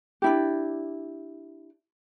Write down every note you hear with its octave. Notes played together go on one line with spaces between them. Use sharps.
D4 E4 G4